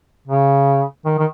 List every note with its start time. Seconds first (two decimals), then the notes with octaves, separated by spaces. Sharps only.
0.27 C#3
1.06 D#3
1.19 D#3